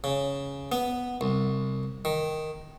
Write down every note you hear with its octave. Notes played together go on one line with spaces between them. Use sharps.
C#3
B3
C2
D#3